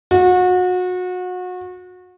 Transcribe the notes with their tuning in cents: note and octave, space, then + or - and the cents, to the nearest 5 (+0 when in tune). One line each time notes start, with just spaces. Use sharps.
F#4 -30